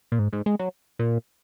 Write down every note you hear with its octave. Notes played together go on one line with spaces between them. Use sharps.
A#2
G#2
G#2
G#3
F#3
A#2